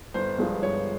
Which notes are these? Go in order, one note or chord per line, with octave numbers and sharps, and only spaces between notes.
G1 C5
G2 F3 G#3
G1 C#5